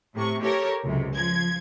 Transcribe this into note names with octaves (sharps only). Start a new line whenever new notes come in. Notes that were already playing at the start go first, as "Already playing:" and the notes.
A2 C3 C#6
G4 A4 A#4 C#5
C#2 F#2 C3
F3 G#6